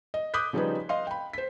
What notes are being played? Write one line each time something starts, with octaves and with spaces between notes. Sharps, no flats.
D#5
D6 D#6 F#6 G6 B6
C#3 F3 G3 D#4 G#4 B4
D#5 F5 C6
G5 B5
C5 B6